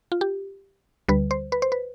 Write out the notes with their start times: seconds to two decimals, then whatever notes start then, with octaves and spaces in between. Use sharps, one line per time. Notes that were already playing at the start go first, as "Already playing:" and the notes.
0.12 F4
0.21 G4
1.08 D2 D3 G3 B4
1.31 C5
1.52 B4
1.62 C5
1.72 B4